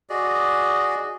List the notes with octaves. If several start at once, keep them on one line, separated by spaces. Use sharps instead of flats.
F#4 G#4 D5 D#5